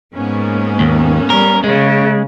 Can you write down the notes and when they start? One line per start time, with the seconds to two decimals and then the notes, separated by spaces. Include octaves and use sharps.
0.16 G#2 A#3 B3 C#4
0.80 D#2
1.30 G3 A#4
1.64 C#3 G#3